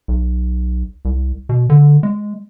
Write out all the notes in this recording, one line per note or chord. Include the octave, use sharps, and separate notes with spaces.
B1
C2
B2
D3
G#3